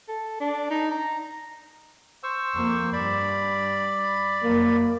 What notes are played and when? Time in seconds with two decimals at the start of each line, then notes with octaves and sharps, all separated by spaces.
0.08 A4
0.40 D4
0.71 D#4
0.92 A#5
2.23 C5 C#6 E6
2.54 F2 A#3
2.93 G2 D5 B5
4.43 F#2 A#3